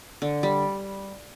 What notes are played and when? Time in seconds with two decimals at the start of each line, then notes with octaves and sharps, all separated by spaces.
0.22 D3
0.43 G3